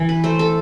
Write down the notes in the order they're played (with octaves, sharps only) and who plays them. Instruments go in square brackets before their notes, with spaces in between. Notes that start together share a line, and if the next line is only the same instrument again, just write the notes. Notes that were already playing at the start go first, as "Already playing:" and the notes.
Already playing: [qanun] E3
B4
A3 C5
A4